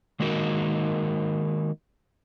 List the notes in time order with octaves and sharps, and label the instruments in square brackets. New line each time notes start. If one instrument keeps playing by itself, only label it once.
[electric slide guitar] D#3 G#3 A#3 D#4 F#4 A#4